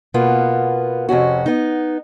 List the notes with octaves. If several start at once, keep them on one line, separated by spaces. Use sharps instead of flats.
B2 A#3 B3 F4
F2 C3 C#4 F#4
B3 D#4